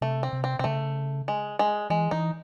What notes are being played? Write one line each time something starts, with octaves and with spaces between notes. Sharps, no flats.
C3 A3
C4
C3
C4
C3 C4
C#3 A3
G#3
G#3
E3 G#3
E3 D#4